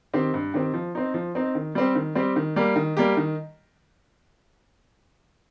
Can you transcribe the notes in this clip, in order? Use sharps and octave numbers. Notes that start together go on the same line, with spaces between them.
D#3 C4 G4
G2
D#3 C4 G4
F3
C4 D#4
F3
C4 D#4
D#3
G3 C4 G4
D#3
G3 C4 G4
D#3
G3 A#3 G4
D#3
G3 A#3 G4
D#3